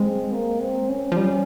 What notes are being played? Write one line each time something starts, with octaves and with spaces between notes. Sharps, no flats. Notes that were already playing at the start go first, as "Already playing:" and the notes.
Already playing: G#3 C4
A#3
C4
C#4
F3
G3